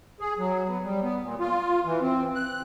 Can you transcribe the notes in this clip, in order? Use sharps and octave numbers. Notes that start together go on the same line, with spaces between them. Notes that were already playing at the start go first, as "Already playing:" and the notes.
G#4
F#3
B3
G3
B3
A#2
F4
E3
C4
F#6